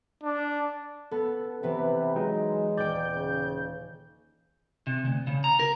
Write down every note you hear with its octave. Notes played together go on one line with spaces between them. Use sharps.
D4
B3 A4
C3 E3 B3 B4
F#3 G#3 D#4
D#1 D5 G5 G6
C#3
C3
D2
C#3
A#5
A#4